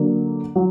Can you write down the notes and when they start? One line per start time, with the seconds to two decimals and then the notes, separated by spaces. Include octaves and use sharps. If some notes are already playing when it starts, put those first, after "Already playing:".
Already playing: D3 F#3 A#3 D4
0.55 F#3